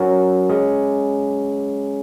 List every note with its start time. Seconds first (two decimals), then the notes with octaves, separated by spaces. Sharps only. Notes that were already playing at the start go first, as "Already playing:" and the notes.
Already playing: F#3 C#4 F#4 A#4
0.49 G#3 C#4 G#4